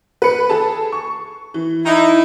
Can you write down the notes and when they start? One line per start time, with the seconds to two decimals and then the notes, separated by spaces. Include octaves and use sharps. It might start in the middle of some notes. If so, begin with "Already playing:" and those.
0.22 B4 C#7
0.49 G#4 A4 A5
0.92 C#6
1.54 E3
1.85 D#4 E4